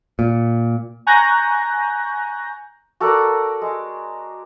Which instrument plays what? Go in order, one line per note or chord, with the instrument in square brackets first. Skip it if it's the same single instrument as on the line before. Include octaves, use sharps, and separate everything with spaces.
[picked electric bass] A#2
[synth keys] G#5 A#5 C#6 F#6 G6 A#6
[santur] F#4 A4 A#4 D5
G#3